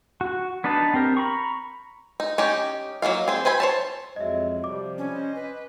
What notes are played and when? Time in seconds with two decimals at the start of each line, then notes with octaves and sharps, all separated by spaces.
0.21 F#4
0.64 B3 D4 D#4 B4 A5
0.94 C4 G4 A#4
1.17 A#5 B5 C#6
2.20 D#4
2.38 C#4 D#4 G4
3.02 F#3 A#3 D#4 F5
3.28 C4 G#4
3.45 B4 C5 G#5 B5
3.60 C5 C#5 A5
4.16 F2 F#3 G#3 D#5 E5
4.64 C3 F3 G3 D6
4.98 C#4
5.11 C5 D#5
5.35 B4